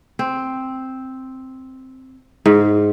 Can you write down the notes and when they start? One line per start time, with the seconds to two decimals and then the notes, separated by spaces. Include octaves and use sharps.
0.19 C4
2.46 G#2